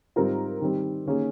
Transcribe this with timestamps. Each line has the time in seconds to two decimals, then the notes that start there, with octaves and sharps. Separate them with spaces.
0.16 G#2 G3 C4 F4 A#4
0.61 D#3 G3 C4
1.06 D#3 A#3 C#4 G#4